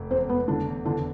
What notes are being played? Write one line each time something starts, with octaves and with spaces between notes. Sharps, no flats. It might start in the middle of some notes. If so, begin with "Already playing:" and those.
Already playing: F1 A3
E2 C4 C5
F1 B3 B4
D3 A3 D4
E2
E2 D3 D4